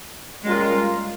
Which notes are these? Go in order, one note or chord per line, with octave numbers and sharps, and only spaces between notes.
G3 G#3 A#3 C#4 F4 A#4